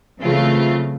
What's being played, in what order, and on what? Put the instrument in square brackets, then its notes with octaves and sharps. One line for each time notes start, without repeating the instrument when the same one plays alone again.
[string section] C#3 E3 F#3 A3 C4 F4